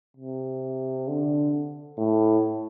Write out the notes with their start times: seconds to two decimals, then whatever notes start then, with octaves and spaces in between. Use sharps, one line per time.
0.17 C3
1.08 D3
1.98 A2